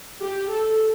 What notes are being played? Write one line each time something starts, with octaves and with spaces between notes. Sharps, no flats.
G4
A4